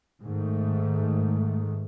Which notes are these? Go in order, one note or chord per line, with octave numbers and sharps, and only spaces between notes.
G#2 D#3 A3